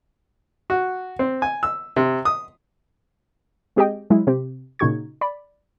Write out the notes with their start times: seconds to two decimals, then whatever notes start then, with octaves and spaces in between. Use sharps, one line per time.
0.70 F#4
1.19 C4
1.42 G#5
1.63 E6
1.96 C3
2.25 D#6
3.76 G#3 C4 G4 G#4 D#5 G5
4.10 F#3 G#3 E4
4.27 C3 C4 G4
4.79 A#2 C#3 D#4 F#4 C#6 G#6
5.21 D5 B5